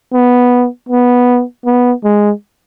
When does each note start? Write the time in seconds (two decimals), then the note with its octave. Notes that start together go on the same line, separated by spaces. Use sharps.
0.13 B3
0.89 B3
1.66 B3
2.04 G#3